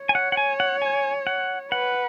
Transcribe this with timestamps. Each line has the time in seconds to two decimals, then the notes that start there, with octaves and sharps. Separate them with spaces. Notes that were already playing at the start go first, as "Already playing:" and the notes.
Already playing: C#5
0.09 G#5
0.15 F#5
0.32 F#5
0.37 G#5
0.60 F#5
0.82 G#5
1.27 F#5
1.71 B4 F#5